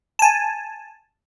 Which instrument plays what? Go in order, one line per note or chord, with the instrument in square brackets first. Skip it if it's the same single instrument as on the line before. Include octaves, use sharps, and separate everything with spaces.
[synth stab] G#5 A5